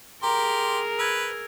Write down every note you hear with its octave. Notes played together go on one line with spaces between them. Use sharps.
G4 G#4 A#4 A#5 C6
B4 E6 G#6